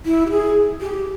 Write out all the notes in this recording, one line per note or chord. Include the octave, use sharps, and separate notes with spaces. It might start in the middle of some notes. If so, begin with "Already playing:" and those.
E4
G4
G#4
G4